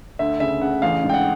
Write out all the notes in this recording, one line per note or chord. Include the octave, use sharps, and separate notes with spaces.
D2 E5
C#3 E5
C#3 F#5
A1 F5
G#2
G5
F#5